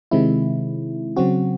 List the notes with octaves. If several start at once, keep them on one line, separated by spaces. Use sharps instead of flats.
C3 D#3 G#3 C4 E4
C#3 F#3 C4 F#4